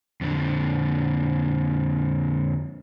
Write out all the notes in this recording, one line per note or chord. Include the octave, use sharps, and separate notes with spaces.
F2 D3